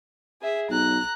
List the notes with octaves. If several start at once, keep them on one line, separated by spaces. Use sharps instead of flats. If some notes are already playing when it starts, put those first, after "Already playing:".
G#4 E5
B1 A#5 F#6